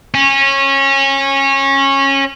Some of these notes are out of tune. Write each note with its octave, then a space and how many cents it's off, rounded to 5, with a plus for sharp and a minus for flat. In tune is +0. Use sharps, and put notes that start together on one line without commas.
C#4 -20